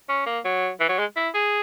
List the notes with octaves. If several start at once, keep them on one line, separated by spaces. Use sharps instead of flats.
C#4
A#3
F#3
E3
F#3
G#3
E4
G#4